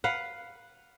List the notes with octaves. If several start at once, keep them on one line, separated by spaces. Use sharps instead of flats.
B4 F5 F#5